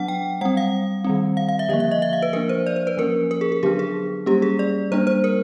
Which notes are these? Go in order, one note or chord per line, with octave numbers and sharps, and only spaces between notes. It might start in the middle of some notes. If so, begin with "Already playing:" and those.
Already playing: F#3 B3 D4 F#5
G5
G3 C4 F#5
F5
D#3 G3 C4
F5
F5
E5
D3 F3 A#3 D#5
E5
D#5
E5
F5
B4
F3 A#3 D4 A#4
C5
D5
C5
B4
F3 A#3 C#4 A#4
A#4
G#4
G#4
D3 F#3 B3 D4 G4
G#4
G3 A#3 C#4 G4
G#4
D5
G3 A#3 D4 C5
C5
A#4